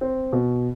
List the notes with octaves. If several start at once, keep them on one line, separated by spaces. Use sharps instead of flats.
C4
B2